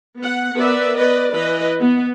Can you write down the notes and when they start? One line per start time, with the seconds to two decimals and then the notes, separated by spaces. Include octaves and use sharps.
0.19 B3 F#5
0.56 B3 A#4 B4 D5 E5
0.96 B4 D5 D#5
1.31 E3 B4 D#5
1.80 B3